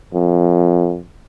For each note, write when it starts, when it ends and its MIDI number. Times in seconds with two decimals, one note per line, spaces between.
0.14 1.01 41